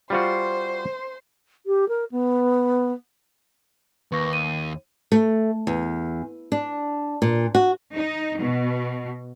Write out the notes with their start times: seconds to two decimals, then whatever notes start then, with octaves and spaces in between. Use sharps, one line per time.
0.10 G3 F4 F#4 C5 C6
1.66 G4
1.88 A#4
2.11 B3
4.12 D#2 B4 C#6 A#6
4.33 D#7
5.12 A3
5.67 E2
6.52 D4
7.22 A#2
7.55 F#4
7.94 D#4
8.39 B2